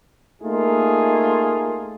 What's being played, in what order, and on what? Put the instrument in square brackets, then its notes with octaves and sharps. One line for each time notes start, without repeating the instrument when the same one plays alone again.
[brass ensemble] A3 A#3 D#4 F4 G#4